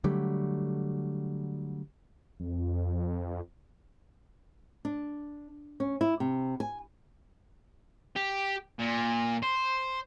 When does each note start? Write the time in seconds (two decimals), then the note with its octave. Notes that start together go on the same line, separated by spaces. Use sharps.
0.04 D3 F#3 G3 A3
2.40 F2
4.85 D4
5.80 C#4
6.01 E4
6.20 C3
6.60 G#5
8.16 G4
8.79 A#2
9.43 C5